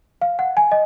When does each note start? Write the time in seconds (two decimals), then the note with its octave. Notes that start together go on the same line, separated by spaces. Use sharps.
0.22 F5
0.39 F#5
0.57 G#5
0.72 D#5